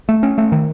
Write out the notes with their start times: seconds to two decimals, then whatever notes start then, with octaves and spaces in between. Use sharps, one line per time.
0.09 A3
0.23 C#4
0.38 A3
0.52 D#3